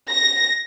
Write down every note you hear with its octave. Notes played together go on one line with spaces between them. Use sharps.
A#6